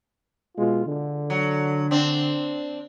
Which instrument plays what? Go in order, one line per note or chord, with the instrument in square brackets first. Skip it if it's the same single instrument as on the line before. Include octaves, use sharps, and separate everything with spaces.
[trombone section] B2 G#3 F4
D3
[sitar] F#3
C4 D4